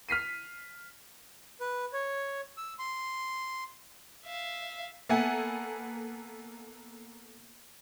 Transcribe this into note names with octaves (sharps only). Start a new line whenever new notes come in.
F6 B6 C7 D#7
B4
C#5
E6
C6
E5 F5
A#3 B3 A4 E5 F#5 G#5